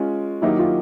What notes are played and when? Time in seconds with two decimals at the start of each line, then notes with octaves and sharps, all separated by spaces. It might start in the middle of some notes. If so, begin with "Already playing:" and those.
Already playing: G#3 C#4 F4
0.42 D#3 F#3 A#3 D#4 E4 G4
0.58 F4